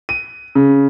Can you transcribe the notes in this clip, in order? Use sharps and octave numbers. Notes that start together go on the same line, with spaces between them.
D#7
C#3